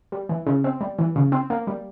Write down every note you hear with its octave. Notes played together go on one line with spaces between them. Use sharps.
G3
E3
C#3
C4
G3
E3
C#3
C4
A#3
G3